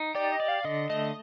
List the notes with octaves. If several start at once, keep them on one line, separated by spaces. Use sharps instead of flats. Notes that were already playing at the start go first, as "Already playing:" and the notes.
Already playing: D#4
G4 D5
D#5
D5
F5
D3 D#5
A3 D#5